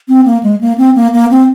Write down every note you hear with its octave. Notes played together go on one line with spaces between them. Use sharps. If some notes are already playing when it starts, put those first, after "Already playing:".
C4
A#3
G#3
A#3
C4
A#3
A#3
C4